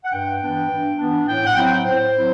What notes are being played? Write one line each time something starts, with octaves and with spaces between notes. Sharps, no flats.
F#5
G2 G5
E3 B3 D4
G2
E3 B3 D4
A2 G5
F#5
F#3 C4 E4 G5
A2 C5
F#3 C4 E4